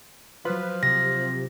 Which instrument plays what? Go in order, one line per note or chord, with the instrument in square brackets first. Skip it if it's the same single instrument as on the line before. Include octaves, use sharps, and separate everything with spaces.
[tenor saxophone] F3 [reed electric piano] F#3 F4 [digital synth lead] B4
[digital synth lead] C3 [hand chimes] A#6